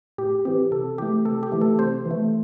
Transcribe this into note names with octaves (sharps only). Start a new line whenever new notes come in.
A2 G4
E3 C4 G4
C3 A4
E3 A3 G4
C3 A4
G4
E3 A3
A4
C3 C5
E3
A3